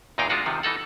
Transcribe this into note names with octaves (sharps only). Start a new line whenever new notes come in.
E2 A#2 D#4 G#4 F5 G5
G#3 D4 F4 F#4 F#5
C3 D#3 F3
E3 D#4 A4 F#5